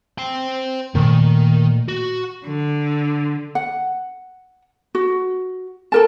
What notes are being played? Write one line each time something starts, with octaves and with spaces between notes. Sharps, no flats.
C5 G5
A#2 D#3 A3
F#4
D3
F#5
F#4
A4 A#4 A5